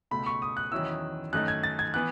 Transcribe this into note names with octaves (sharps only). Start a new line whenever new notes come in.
C#2 B2 A3 B5
C#6
D#6
F#6
E2 D#3 F#3 C#4 E4 E6
F#2 D#3 A3 D#4 F#6
G#6
A6
G#6
E3 B3 F#6